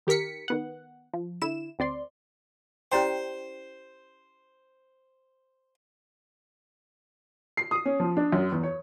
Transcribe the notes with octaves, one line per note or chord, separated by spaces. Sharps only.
D#3 G4 A#4 B6 C#7
D#3 B3 F#5
F3
D3 E4 E7
D2 C4 D5 C6
C#4 E4 G4 C5 D5 G5 C6
C7
D#6
C#4
F3
D4
F#2
E2
C#5